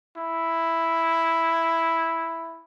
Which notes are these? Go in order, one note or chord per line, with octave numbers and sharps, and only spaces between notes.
E4